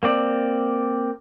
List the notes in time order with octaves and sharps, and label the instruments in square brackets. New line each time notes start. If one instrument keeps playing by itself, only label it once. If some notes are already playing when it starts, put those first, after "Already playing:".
[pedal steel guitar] A#3 C4 D5